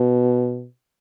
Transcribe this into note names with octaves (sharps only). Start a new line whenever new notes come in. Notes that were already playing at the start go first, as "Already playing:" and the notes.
Already playing: B2